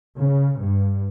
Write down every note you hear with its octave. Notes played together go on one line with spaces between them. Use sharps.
C#3
G2